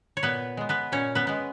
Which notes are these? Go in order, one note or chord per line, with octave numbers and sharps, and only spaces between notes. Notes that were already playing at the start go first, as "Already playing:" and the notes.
C#5
A#2 B3 B4
G#3 B3
B3 B4
A#2 C#4 C#5
B3 B4
G#3 B3